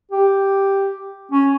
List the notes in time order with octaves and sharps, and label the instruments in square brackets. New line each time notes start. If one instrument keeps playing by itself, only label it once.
[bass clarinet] G4
C#4